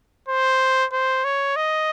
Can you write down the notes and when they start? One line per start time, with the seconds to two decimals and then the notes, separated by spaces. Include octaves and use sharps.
0.28 C5
0.92 C5
1.24 C#5
1.56 D#5